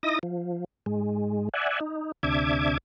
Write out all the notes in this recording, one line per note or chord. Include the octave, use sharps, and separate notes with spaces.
D#4 E4 D#5 D#6 A#6
F3
G#2 G#3
D5 E5 F#5 G#5
D#4
D2 C3 D4 E5 D6 G#6